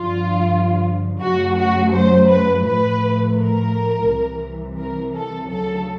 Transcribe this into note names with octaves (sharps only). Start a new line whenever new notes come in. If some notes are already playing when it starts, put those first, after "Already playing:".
Already playing: G2 D3 F3 F4
F#2 C#3 F#3 A3 F#4
F#4
C5
B4
A2 F3 A3 B4
A#4
C2 C3 E3
A#4
A4
D2 C#3 F#3 A4